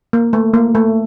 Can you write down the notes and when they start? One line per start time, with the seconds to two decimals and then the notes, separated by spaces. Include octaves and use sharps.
0.13 A#3
0.33 A3
0.54 A#3
0.75 A3